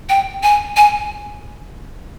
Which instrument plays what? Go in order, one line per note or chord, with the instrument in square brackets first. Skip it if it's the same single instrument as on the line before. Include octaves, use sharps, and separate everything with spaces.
[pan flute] G5
G#5
G#5